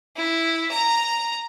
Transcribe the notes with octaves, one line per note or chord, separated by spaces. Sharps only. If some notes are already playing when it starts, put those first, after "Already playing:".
E4
A#5